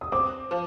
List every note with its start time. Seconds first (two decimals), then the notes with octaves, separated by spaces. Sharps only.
0.01 D#6
0.12 C4 D6
0.51 F3